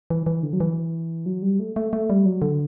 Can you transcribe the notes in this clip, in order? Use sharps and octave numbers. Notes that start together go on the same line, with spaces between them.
E3
E3
D3
F#3
E3
F#3
G3
A3
A3
A3
G3
F#3
D3